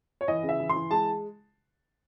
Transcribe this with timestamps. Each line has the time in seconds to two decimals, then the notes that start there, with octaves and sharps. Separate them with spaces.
0.21 C#5
0.28 E3 D#5
0.43 C#3
0.49 E5
0.60 E3
0.69 C6
0.76 E3
0.91 G#3 A5